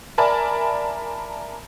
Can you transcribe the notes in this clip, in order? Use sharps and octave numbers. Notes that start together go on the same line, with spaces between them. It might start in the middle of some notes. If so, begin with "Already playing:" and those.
A#4 D5 E5 G#5 A5 B5